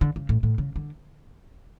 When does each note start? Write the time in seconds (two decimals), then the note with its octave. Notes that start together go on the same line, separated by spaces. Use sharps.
0.01 D3
0.16 C#3
0.29 A2
0.43 A2
0.58 C#3
0.76 D3